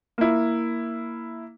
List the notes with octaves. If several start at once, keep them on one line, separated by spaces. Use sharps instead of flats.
A#3 E4